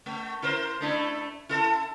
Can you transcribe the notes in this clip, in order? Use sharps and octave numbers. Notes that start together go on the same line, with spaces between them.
A3
E4 A#4 C5
A3 D4 E4
E4 A4